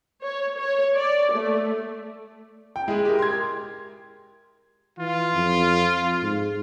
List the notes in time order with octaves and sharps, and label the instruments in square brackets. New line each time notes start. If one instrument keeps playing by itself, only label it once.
[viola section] C#5
C#5
D5
A3
[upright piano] G5
[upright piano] G#3 [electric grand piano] E4 G#4
[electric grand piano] G4 A#4
[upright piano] C6 G#6
[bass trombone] E3 [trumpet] F4
[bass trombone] F2
G#2